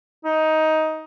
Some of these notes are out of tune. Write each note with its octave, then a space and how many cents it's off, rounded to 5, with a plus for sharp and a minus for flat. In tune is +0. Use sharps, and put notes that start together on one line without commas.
D#4 +15